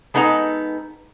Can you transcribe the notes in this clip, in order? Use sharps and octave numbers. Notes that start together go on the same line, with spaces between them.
G#3 B3 D#4 A4 F5 A#5